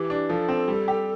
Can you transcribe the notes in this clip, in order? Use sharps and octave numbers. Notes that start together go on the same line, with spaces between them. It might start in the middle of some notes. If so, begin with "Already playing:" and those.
Already playing: E3 G4
D4
F3 A4
C4
G3
G4